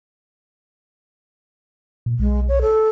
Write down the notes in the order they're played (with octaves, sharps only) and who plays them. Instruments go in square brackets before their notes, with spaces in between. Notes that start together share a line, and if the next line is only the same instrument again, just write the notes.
[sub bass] A#2
[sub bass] B1 [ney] G#3
[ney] C#5
A4